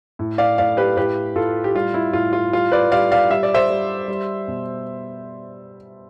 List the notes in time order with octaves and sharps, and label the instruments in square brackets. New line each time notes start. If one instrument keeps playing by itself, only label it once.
[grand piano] A2
D5 F5
A2 D5 F5
G4 B4
A2 G4 B4
A2 F4 A4
G4
G3 F4
E4
A2 F4
F4
G3 F4
B4 D5
G3 D5 F5
D5 F5
G3 E5
D5
C5 E5
G3
G3
B2